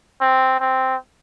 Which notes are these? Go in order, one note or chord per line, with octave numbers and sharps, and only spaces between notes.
C4
C4